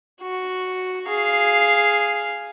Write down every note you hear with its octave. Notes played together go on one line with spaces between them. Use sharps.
F#4
G#4 F5